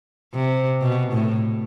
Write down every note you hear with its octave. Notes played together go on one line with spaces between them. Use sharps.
C3
B2
A2